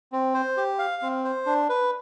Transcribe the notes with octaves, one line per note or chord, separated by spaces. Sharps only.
C4
C5
G4
F5
C4
C5
D4
B4